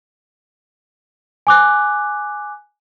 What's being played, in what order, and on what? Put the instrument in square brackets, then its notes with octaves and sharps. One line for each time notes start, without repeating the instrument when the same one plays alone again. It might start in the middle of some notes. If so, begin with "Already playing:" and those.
[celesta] G#5 D6 F#6